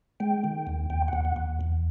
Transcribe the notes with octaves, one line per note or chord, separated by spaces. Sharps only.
G#3 G5
D#3
D#2
D#2 G5
D#2 F#5
F#5
D#2
E2